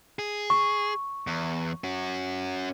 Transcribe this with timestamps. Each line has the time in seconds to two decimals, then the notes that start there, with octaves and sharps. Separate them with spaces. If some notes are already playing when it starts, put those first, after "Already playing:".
0.19 G#4
0.50 C#6
1.27 E2
1.84 C#4 F#4